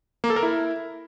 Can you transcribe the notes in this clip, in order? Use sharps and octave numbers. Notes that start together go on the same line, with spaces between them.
A#3
A4
A#4
E4